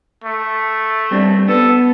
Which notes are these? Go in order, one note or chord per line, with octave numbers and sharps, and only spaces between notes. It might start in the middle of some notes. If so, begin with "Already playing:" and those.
A3
G3 C4 D4
B3 A4